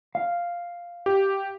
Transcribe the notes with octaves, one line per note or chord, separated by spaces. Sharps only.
F5
G4